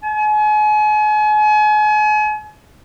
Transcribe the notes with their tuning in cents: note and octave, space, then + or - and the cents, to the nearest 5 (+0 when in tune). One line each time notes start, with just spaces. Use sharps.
G#5 +35